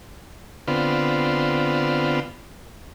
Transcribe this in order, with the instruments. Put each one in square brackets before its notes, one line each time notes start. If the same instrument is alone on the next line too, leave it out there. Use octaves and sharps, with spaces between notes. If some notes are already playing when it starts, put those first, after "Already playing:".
[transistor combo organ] D3 B3 C4 F4